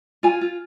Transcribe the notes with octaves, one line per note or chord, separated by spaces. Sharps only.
F4 G#5
F4